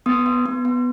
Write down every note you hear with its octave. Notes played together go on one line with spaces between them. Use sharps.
B3 D#6
B3
B3
B3